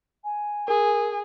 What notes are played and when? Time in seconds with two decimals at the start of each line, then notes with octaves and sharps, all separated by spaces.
0.24 G#5
0.68 G#4 A#4